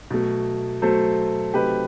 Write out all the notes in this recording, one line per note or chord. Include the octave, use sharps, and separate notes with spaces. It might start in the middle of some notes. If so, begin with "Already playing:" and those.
B2 F#3 A3
B2 F#3 A3 A4 C5
C3 F#3 A3 C4 D#4 G4 B4